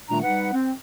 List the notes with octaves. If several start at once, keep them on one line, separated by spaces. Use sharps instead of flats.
A#2 D#3 G3 A3 D4 A#5
G3 D#4 B4 F#5
C4